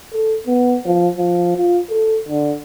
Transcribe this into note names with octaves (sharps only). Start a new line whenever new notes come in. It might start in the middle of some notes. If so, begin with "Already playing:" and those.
A4
B3
F3
F3
F4
A4
D3